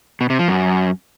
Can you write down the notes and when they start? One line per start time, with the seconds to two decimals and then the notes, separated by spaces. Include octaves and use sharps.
0.21 B2
0.30 C3
0.39 F3
0.48 F#2